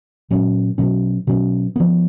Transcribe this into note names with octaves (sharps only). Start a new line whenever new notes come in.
A#2 F#3 C#4
B2 F#3 C#4
B2 F#3 C#4
F3 B3